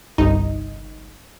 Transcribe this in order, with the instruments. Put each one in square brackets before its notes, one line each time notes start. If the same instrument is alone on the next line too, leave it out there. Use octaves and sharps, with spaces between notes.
[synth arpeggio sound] G1 C2 D#4